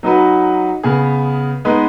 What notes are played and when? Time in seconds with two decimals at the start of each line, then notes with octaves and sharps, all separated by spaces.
0.03 F#3 D#4 F#4 B4
0.84 C#3 B3 G#4
1.65 G#3 B3 D#4 B4